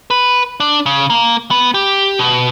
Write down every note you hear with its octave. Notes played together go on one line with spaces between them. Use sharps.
B4
D4
C#3
A#3
B3
G4
B2